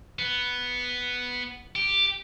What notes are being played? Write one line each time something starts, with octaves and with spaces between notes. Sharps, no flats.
B3
G4